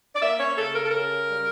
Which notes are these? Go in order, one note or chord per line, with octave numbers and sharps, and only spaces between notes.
D5
A#3 E5
C#5
C#3 A4
A#4
A4
C#3 A#4
G3